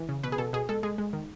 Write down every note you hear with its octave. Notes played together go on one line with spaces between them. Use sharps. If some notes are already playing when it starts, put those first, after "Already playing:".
Already playing: E3
C#3
B2 B4
G#4
B2 A4
B2 G#4
G#3 A4
G#3 G#4
G#3
D#3